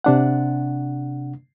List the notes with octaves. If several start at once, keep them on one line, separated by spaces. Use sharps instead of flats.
C3 D4 F#5